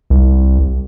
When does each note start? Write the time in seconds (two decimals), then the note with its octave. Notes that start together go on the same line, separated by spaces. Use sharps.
0.10 C2